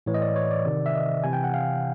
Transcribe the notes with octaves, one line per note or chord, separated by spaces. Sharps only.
A2 E3 C#5
D#5
D5
C#5
D5
C3 D#3
E5
D#5
C3 E3 G#5
G5
F#5
F5